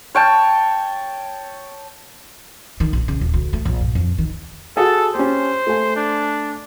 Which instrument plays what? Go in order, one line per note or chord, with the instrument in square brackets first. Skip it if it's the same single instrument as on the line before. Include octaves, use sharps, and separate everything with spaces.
[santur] C#5 G5 A5
[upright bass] D#3
A#1
C#3
D#1
D2
A3
A#1
G2
F2
D#3
[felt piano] F#4 G#4 [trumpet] A4
[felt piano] C#4 G4 [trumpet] C5
[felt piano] A3 G#5
[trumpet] D4